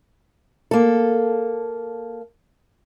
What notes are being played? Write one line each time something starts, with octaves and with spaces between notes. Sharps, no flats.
A#3 A4